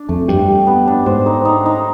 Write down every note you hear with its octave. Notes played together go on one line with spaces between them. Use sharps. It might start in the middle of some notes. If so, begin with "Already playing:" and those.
Already playing: D4
F2 A3
G2 G4
G4
B3
D4
G#2 C5
D#4
D#4
D#4